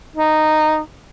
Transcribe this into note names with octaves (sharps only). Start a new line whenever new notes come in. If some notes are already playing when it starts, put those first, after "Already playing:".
D#4